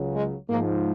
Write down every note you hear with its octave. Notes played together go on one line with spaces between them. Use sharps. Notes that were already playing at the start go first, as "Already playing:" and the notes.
Already playing: C#2 C#3 F#3
G#3
G#2 F3 A#3